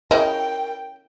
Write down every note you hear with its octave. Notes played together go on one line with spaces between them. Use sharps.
C#3 E4 A#4 D#5 G5